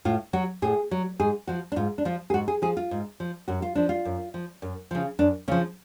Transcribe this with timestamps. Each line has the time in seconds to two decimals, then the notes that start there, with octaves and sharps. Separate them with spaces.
0.05 A2 F4
0.33 F#3 F#4
0.62 A2 G#4
0.91 F#3
1.20 G#2 G#4
1.47 F3 F#4
1.72 D4
1.76 G#2 F4
1.98 D4
2.05 F3 F4
2.30 G#4
2.34 G#2 F#4
2.48 G#4
2.62 F3 G#4
2.77 F4
2.91 G#2
3.20 F3
3.48 F#2 F#4
3.62 F4
3.75 F3 D4
3.89 F4
4.05 F#2
4.34 F3
4.62 F#2
4.91 C#3 F3
5.19 F#2 D4
5.48 C#3 C#4
5.51 F3